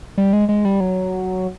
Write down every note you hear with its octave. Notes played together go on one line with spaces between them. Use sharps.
G3
G#3
G#3
G3
F#3